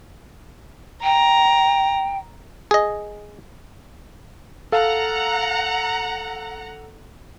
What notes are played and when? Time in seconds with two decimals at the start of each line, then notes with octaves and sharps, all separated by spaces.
1.03 G5 A#5
2.71 G#4 D#5
4.72 A4 F5 F#5 A#5